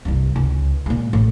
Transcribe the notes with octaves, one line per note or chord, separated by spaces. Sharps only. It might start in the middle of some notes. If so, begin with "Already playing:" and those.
C2 G2
C#2
A#2 G#3
A1 A2